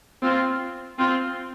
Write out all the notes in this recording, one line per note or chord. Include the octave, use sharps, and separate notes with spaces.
C4 F4
C4 F4